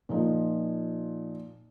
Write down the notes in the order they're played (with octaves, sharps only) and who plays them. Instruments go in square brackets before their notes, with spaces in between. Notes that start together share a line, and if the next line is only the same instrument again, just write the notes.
[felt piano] A#2 F3 D#4